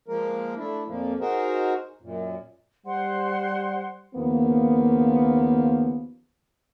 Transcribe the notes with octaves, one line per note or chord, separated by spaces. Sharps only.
F3 G#3 A#3 A#4
A3 D4 E4
F2 A#2 F3 A#3
D#4 F#4 G#4 A#4 C5
F#2 A#2
G3 C5 F#5 C6
D#2 C#3 F3 A#3 B3